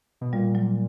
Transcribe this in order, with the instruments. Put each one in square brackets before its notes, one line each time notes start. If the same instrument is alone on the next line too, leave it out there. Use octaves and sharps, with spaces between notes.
[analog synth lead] B2
[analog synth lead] A#2 [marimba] G3
[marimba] F#3